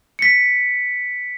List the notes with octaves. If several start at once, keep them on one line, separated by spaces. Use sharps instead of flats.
B6 C#7